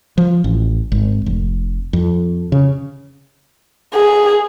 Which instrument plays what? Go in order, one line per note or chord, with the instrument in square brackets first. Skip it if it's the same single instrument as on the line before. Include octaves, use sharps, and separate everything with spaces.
[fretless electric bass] F3
A1
G#1
F1
F2
C#3
[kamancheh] G#4